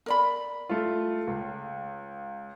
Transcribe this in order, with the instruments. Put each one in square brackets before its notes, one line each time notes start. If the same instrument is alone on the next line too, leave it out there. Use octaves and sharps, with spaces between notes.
[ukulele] A#4 D5 B5
[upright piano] A3 F4
C#2